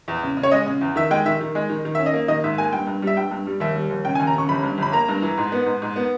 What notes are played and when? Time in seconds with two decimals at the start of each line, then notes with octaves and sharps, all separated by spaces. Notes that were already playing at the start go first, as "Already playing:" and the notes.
0.08 E2
0.23 C#3
0.37 C#3
0.43 C#5
0.52 G#3 D#5
0.66 C#3
0.81 E2
0.96 D#3 E5
1.11 G#3 G5
1.25 D#3 E5
1.41 D#3
1.55 G#3
1.70 D#3
1.85 D#3
1.95 E5
1.99 C#4
2.06 D#5
2.14 A#3
2.28 D#3 D#5
2.44 G#2 E5
2.57 A#3 G#5
2.73 G2 G5
2.87 G2
3.02 G3 E5
3.17 G2 G5
3.31 G2
3.47 G3
3.60 D#2 E5
3.76 G3
3.90 D#2
4.05 C#3 G5
4.15 G#5
4.19 D#2
4.27 A#5
4.35 C#3 C#6
4.49 G1 B5
4.63 G2
4.78 G1 B5
4.92 A#3 A#5
5.08 G2
5.22 E3
5.37 G#2
5.52 B3
5.66 G#2
5.82 G#2
5.96 B3